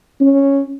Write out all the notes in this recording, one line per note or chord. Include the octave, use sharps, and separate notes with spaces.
C#4